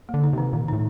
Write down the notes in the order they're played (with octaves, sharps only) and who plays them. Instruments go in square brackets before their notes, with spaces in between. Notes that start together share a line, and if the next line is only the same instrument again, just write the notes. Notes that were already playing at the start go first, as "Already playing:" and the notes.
[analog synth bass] D3 [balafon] A#3
[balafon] D#4
[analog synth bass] C3 [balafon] D#3
[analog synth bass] A#2 [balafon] D#3
[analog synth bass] A2 [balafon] D#4